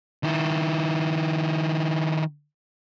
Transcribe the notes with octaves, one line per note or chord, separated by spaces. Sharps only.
D#3 E4